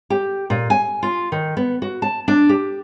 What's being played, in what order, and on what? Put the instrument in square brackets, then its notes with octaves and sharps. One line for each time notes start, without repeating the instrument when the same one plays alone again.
[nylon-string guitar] G4
A#2
G#5
F4
D#3
B3
F#4
A5
D4
G4